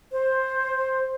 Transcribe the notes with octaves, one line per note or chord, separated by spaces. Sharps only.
C5